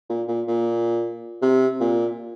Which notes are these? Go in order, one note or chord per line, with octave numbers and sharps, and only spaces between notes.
A#2
A#2
A#2
C3
A#2